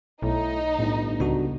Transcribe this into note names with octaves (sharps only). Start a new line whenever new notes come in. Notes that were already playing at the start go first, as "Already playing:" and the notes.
B1 A2 D#4
G1 A2
C#2 D4 F#4